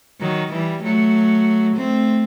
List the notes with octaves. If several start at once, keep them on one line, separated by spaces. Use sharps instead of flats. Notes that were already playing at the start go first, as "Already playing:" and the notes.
D#3 F#3
E3 G3
F#3 A3
A3 C4